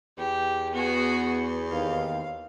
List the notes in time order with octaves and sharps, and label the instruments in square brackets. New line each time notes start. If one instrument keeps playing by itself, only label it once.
[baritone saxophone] E2 [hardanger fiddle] G4
[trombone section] B3 [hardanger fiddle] F#4 G#4
[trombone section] D#2 [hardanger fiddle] F5